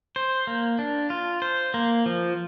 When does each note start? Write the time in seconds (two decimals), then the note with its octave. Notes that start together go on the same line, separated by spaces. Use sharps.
0.16 C5
0.47 A#3
0.79 D4
1.10 F4
1.42 C5
1.74 A#3
2.06 F3